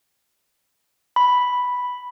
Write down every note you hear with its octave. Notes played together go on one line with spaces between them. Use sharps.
B5